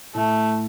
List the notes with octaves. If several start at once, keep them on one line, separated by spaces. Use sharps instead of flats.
A2 A3